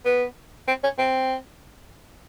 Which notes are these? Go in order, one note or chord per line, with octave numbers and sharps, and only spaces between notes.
B3
C4
C#4
C4